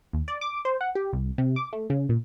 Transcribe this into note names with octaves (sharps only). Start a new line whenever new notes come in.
D#2
D5
D6
C5
F#5
G4
C2
C3
D6
A3
C#3
A#2